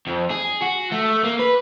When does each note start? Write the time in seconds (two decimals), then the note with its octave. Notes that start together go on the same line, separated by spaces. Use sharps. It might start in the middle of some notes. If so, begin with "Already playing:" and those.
0.07 F2
0.31 G#4
0.62 F#4
0.92 A3
1.24 A#3
1.39 B4